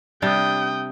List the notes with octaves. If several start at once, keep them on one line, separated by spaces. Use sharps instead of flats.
C3 G3 D4 G5 D#6